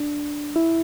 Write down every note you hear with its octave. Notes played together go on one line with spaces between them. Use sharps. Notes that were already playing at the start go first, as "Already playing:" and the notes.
Already playing: D4
E4